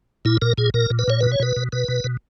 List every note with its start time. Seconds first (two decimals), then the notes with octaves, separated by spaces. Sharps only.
0.25 A#2 E4
0.42 A#2 A#4
0.58 A#2 G#4
0.74 A#2 A#4
0.90 A#2
0.99 B4
1.08 A#2 C#5
1.21 B2 B4
1.32 C#5
1.40 B2 B4
1.56 B2
1.72 B2 B4
1.88 B2
2.04 B2